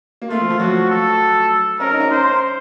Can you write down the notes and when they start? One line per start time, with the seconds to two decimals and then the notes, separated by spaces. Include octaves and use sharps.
0.22 A#3
0.29 A3 F4
0.40 F3
0.50 F3
0.59 F#3 F#4
0.89 A4
1.80 C#4 A#4
1.91 D#4
2.00 C#4
2.10 C5